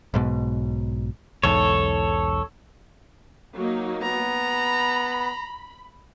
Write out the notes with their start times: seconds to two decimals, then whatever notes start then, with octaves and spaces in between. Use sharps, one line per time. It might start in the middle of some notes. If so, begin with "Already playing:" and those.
0.14 B1 G#2 B2
1.43 B1 E2 G#2 A4 C#5
3.56 F#3 A#3 D#4
4.02 B3 A#5
4.47 B5